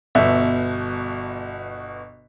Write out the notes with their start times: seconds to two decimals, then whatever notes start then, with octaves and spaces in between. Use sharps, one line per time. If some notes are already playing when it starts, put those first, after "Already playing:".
0.15 G1 B2 E5